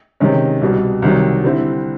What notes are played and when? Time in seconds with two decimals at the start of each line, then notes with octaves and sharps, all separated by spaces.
0.20 C3 D#3 G#3 C#4
0.61 C2 B2 G3
1.02 C2 C3 D#3 F#3
1.44 D3 G3 C4 E4